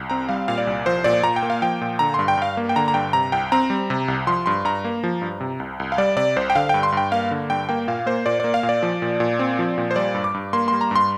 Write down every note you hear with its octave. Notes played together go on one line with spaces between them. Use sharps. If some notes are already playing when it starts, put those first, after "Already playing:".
Already playing: C2
C4 A#5
G3 F5
A#2 F5
D5
C2
F3 C5
A#2 D5
A#2 A#5
G5
A#3
F5
F3 G5
A#2
D3 A#5
G2 C6
G5
G2 F5
A#3
G5
D3 A#5
A#5
G2 G5
C3 A#5
C2 G5
C4 A#5
G3
C3
C2
F3 C6
G2 C6
G2 A#5
A#3
F3
G2
C3
C2
C2
F5
G3 D5
C3 D5
C2 C5
G5
D3 F5
G2 G5
C6
G2 G5
A#3 F5
D3
G2 G5
A#3 G5
A#2 F5
A#3 C5
A#2 D5
A#3 D5
F5
A#2
D5
F3
A#2
A#2
C4
F3
A#2
C5
G3 D5
G2
D6
G2
A#3 C6
G3 C6
A#5
G2 C6